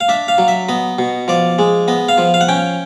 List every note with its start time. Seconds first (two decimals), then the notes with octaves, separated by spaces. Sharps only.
0.01 F5
0.09 D4 E5
0.28 F5
0.38 F#3
0.48 E5
0.69 B3 D#5
0.99 B2
1.28 F3 D5
1.59 G#3
1.88 B3 D#5
2.09 F5
2.18 F3
2.34 F5
2.41 F#5
2.49 C#4 G5